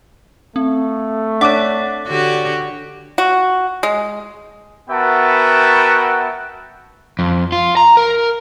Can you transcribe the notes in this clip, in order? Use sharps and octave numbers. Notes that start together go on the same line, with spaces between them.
A3 C4
D4 C#5 F#5 D6
D3 F#4 G4
F#4
G#3
B3 F#4 A#4 E5 G5 A5
F2
F4
A#5
A#4